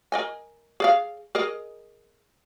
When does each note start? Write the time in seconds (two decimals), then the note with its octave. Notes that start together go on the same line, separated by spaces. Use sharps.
0.12 A#4 D#5 G#5
0.80 G#4 D5 F5
1.35 G#4 A#4 D#5